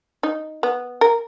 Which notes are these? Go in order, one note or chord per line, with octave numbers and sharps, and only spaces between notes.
D#4
B3
A#4